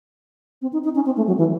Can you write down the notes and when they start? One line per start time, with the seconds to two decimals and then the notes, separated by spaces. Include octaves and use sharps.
0.62 C4
0.73 D#4
0.84 D#4
0.95 C#4
1.06 C4
1.16 A3
1.27 F#3
1.38 E3